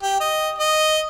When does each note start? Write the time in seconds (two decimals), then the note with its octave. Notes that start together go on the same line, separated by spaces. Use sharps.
0.02 G4
0.20 D#5
0.59 D#5